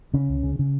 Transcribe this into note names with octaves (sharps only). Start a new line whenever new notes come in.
C#3 C#4
C#2
C#3
C#3